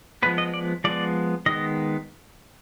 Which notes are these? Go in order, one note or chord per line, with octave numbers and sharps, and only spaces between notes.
F3 G#3 B3 B4
D#5
D5
F3 G#3 B3 D5
D#3 G#3 B3 D#5